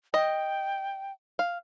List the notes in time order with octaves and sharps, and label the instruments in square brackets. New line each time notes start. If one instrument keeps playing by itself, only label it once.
[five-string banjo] D#5 [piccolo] G5
[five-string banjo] F5